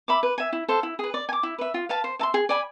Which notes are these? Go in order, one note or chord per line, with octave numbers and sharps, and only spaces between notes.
E5 B5 D6
B4
E5 G#5
E4
A4 C5 F5
E4
G#4 B4
D5
G#5
D6
E4
B4 E5
F4
B4 F5 A5
C5
E5 A5 C6
G#4
D5 G#5 B5